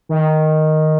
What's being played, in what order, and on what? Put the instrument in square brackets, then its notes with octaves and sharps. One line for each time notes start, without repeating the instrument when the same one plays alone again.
[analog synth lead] D#3